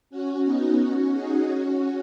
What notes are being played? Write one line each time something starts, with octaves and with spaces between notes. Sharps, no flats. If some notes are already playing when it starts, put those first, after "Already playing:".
C#4 F#4
B3 D#4
C#4 F#4
D#4 G#4
C#4 F#4